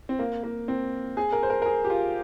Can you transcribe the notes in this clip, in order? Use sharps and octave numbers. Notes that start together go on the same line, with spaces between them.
C4
A#3
A#3
C4
G#4
A#4
C5
A#4
A#4
G#4
G4
F4